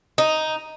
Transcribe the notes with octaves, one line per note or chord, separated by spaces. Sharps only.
D#4